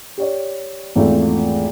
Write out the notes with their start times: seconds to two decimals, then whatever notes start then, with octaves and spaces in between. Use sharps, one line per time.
0.17 G4 C#5 D5
0.96 G#1 E2 A3 F4